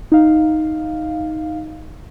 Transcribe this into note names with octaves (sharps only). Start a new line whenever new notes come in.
D#4 F5